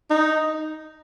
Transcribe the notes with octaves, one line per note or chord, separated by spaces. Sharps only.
D#4